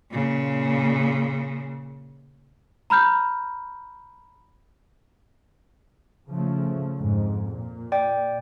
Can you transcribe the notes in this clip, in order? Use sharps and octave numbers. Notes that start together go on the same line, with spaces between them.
A#2 C#3
A#5 B5 F6 G6
C#3 F3 A3
F2 G#2
A#2
D5 G5